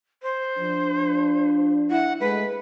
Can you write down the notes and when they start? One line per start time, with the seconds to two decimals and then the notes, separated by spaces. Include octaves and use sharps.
0.23 C5
0.58 F3 D4
1.91 E4 F#5
2.21 G#3 A3 B4